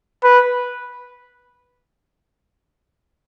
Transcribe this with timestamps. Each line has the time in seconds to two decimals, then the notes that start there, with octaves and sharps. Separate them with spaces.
0.24 B4